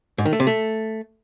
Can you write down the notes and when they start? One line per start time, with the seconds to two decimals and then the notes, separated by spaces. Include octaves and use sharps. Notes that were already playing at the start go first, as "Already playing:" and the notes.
0.18 G#2
0.26 D#3
0.33 A3
0.40 C3
0.47 A3